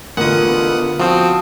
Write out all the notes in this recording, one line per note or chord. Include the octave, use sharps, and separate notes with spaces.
A1 D3 B3 F4 A#4 F#5 D#6
F3 C4 F#4 A5 C6 D#6 G6